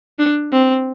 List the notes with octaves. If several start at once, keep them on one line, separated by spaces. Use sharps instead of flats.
D4
C4